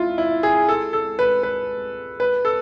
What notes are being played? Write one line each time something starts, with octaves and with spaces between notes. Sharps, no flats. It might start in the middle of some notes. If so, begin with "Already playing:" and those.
Already playing: E4 F4
E4
G#4
A4
A4
B4
B4
B4
A4